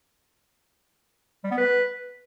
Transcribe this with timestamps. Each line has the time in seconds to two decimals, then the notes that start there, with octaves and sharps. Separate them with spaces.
1.44 G3
1.51 B3
1.58 B4